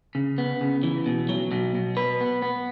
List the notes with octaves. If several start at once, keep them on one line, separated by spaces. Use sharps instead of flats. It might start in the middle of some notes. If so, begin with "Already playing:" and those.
C#3
B3
C#3
E3
B2
F#3
B2
B2
B4
B3
B3